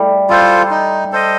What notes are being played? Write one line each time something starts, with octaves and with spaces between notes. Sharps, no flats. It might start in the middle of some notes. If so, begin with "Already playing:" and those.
Already playing: G3 A3
G3 F4 A4 C5
D#4
A4 C5 D#5